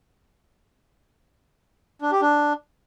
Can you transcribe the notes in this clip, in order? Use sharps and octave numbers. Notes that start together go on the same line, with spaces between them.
D4
G4
D4